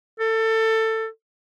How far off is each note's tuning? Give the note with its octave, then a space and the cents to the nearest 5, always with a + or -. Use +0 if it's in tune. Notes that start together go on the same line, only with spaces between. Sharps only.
A4 +20